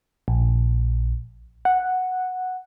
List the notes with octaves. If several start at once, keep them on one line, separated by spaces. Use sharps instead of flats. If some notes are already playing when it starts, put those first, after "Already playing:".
A#1
F#5